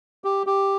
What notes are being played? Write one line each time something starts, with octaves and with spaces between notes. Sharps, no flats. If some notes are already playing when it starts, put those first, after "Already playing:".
G4
G4